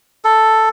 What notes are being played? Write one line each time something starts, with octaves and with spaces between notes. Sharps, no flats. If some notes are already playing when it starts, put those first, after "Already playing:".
A4